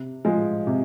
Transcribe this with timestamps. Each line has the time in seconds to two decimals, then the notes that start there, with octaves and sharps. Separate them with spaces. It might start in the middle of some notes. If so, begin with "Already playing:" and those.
Already playing: C3
0.25 F3 G#3
0.67 C3